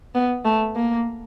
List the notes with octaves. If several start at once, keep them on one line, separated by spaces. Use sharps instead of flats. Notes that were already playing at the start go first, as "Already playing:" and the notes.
B3
A3
A#3